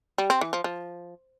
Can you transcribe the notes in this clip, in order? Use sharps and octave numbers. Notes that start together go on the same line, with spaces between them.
G3
C4
E3
F3
F3